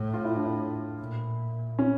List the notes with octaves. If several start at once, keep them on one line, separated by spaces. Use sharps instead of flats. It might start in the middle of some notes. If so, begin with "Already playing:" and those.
Already playing: A2
F4
E4
D4
E4
A#2
C#4